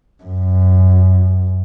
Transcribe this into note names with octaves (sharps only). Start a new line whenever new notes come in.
F#2